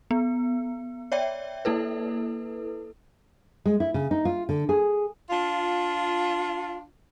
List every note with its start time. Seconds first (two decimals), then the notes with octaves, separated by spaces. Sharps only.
0.11 B3
1.12 C#5 D5 E5 G5
1.65 A#3 E4 A4 B4
3.66 G#3
3.80 E4
3.94 C#3
4.11 D#4
4.25 F4
4.49 D3
4.69 G#4
5.30 D4 F4